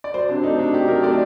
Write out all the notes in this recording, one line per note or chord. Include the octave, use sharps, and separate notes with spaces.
D5
F#3 C5
C3 D4
A3 D#4
C3 D4
F#3 G4
C3 A#4
A3 D5